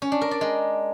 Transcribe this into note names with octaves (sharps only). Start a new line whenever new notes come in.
C#4
D4
A#4
D5
G#3